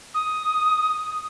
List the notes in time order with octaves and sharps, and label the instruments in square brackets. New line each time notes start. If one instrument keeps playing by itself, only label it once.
[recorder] D#6